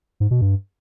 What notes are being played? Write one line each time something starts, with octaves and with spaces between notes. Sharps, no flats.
G#2
B2
G2